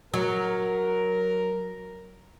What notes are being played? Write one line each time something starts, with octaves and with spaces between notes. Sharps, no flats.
F#3 A#4